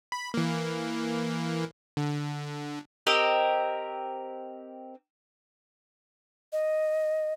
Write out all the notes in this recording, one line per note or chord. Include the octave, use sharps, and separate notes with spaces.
B5
E3 A#3
D3
C4 G4 A#4 D#5
D#5